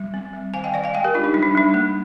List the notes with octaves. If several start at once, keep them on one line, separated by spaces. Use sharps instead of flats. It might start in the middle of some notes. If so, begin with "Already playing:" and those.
Already playing: G3
C4
G3
D#3 F5 G#5
D#5 G5
D#3 D5 F5
F5 G#5
G#3 D#5 G5
G4 A#4
D4 F4
D#4
G3 D#4
D4
G3 D4
A#3